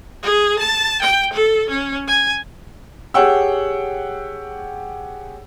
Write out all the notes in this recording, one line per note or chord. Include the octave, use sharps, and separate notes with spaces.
G#4
A5
G5
A4
C#4
G#5
G4 G#4 C#5 F#5 G5 E6